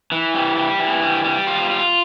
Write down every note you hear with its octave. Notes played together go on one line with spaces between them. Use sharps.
E3
G3
G3
E3
G3
G3
F4
F4